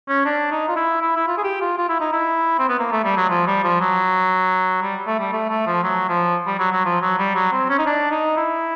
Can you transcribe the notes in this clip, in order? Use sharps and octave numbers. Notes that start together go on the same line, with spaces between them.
C#4
D4
D#4
F4
E4
E4
E4
F4
G#4
G4
F4
F4
E4
D#4
E4
C4
B3
A#3
A3
G3
F#3
F3
G3
F3
F#3
G3
A3
G3
A3
A3
F3
F#3
F3
G3
F#3
F#3
F3
F#3
G3
F#3
C4
C#4
D#4
D4
D#4
E4